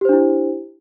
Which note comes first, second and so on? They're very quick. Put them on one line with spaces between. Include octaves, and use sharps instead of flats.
G4 C5 D4 E4